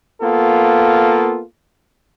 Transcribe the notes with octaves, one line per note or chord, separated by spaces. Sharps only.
A#3 B3 F4 A4